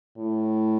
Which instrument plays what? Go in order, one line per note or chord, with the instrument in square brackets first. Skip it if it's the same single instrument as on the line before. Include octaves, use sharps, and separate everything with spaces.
[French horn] A2